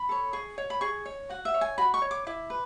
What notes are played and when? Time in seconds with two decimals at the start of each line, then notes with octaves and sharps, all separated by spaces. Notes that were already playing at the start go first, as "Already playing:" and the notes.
Already playing: B5
0.09 A4 C#5
0.33 G#4 C#6
0.58 C#5
0.70 B5
0.81 G#4 C#6
1.06 C#5
1.29 F#4 F#5
1.45 E5
1.54 C#5
1.61 G#5
1.78 F#4 B5
1.94 C#6
2.02 C#5
2.11 D6
2.27 E4 D6
2.50 B4